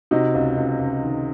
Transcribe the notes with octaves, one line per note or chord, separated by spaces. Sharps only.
C3 D#4 F#4
C#2
C#2
C#2
D#3